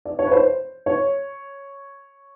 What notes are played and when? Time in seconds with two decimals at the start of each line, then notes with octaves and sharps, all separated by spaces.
0.05 D5
0.19 C#5
0.27 B4
0.32 C5
0.86 C#5